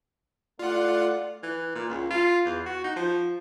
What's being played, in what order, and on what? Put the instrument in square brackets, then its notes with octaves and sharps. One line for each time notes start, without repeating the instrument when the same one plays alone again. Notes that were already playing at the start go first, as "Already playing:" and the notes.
[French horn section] A3 D5 [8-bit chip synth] F4 F#5
[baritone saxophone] E3
A#2
C#2
F4
E2
F#4
D#4
F3